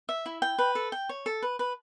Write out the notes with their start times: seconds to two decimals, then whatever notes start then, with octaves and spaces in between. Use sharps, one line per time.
0.09 E5
0.26 E4
0.42 G5
0.59 B4
0.75 A4
0.92 G5
1.09 C#5
1.26 A4
1.42 B4
1.59 B4